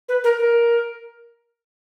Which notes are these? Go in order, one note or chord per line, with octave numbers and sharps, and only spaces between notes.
B4
A#4
A#4